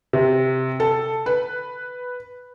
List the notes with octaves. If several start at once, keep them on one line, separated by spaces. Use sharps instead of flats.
C3
A4
B4